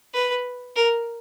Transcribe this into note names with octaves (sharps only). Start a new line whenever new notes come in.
B4
A#4